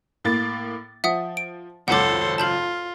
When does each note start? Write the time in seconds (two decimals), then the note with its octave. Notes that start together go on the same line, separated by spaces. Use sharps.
0.24 A2 A#3 A6
1.04 F3 E5 F#5 D#6
1.37 D7
1.88 G#1 C#2 F#2 A4 C5 C#5 F#5 D6
2.38 F4 A5 G6 F#7